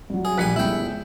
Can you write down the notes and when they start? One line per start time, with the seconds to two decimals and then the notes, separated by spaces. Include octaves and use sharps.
0.10 G2 F#3
0.25 G#4
0.38 A#1 G3 G#5 F#6 B6 C#7
0.56 G1 C#2 E4 G5